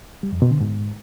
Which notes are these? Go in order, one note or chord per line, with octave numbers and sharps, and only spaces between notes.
G3
F2
B2
D3
G#2